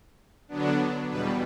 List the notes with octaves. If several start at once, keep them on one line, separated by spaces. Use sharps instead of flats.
D3 F#3 B3 D4
E2 B2 G3 B4